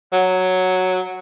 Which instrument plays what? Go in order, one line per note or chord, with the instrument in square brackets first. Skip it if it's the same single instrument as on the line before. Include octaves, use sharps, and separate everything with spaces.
[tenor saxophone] F#3